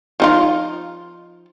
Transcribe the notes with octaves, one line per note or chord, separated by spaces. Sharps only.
F3 D#4 F4